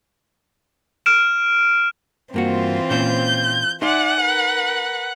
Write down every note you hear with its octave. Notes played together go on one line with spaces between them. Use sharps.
F6 D7 E7
G2 E3 A#3 C4 F4 F#4
A#2 C#4 C5 G6
D#4 D5 E5 F#5 G#5 C6
A#4 B4